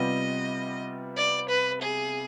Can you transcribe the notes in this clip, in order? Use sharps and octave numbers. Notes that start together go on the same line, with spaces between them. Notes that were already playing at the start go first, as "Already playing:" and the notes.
Already playing: C3 G3 B3 F4 D#5
D5
B4
G#4